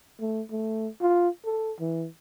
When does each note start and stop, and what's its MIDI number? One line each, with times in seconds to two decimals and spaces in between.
0.20 0.42 57
0.51 0.88 57
1.01 1.29 65
1.45 1.72 69
1.80 2.06 52